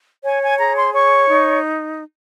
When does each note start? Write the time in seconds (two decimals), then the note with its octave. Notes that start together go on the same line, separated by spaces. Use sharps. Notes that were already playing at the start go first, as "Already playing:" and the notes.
0.23 C#5 G#5
0.42 G#5
0.58 G#4 A#5
0.76 C6
0.93 C#5 C#6
1.28 D#4